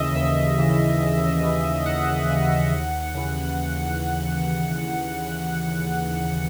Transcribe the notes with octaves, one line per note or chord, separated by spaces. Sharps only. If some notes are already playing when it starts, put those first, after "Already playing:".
Already playing: D#2 C#3 E3 D#5 E5
D#2 E5
C#3 E3
D#2
C#3 E3
D#2 F#5
C#3 E3
D#2
C#3 E3